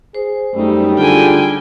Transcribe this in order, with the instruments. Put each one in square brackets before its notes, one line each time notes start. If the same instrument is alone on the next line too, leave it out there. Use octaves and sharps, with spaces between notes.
[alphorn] G#4 [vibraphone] C5
[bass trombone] F#2 [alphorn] G3 [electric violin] A3 D#4
[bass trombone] D3 [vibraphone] F4 G#4 [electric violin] G5 G#5